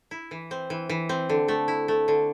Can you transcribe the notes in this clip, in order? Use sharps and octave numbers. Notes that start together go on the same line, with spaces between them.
E4
E3
C4
E3
E3
C4
D3
A3
E4
A3
D3